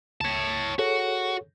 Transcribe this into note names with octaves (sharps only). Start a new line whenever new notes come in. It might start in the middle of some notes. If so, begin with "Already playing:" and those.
C#2 C#5 A5 G#6
F#4 G#4 A4 C#5